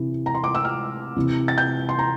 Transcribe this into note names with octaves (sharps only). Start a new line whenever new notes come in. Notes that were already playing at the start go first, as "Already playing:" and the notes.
Already playing: C3 E3
A#5
C6
D6
E6
F6
C3 E3
A6
G6
C6
A#5